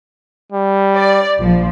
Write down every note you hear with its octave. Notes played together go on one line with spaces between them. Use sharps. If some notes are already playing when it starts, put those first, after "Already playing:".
G3
D5
A#1 F3